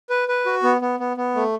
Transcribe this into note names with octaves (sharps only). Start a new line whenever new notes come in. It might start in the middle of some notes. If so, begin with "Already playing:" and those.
B4
B4
F#4
B3
B3
B3
B3
A3